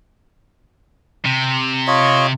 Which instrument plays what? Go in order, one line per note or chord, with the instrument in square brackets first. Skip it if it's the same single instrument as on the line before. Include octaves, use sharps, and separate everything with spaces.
[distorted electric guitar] C3
[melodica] F4 C#5 D#5